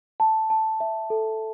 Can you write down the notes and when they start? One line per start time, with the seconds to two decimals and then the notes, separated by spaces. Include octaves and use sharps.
0.20 A5
0.50 A5
0.80 E5
1.10 A4